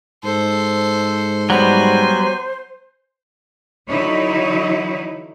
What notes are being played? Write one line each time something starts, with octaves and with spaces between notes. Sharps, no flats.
G#2 A4 C5
F#3 G3 B3 C5 G#5
D3 E3 F#3 D#4 E4 C#5